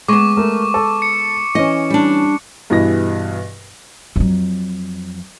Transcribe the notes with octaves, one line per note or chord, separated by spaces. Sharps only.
G#3 B3 C#6 D6
A3 A#4
A4
C#7
E3 C#4 D#5
G3 D4
G2 B2 E3 E4 D#5 A#6
F2 F#3